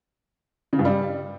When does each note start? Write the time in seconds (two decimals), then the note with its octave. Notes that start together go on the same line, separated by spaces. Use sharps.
0.73 C#3
0.79 G2
0.85 G3